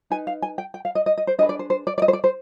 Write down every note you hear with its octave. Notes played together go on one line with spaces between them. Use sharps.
D#4 B4 G#5
F5
G#5
G5
G5
F5
D#5
D#5
D#5
C5
D4 G#4 B4 D#5
D5
C5
C5
D5
D5
D#5
C5
D5
C5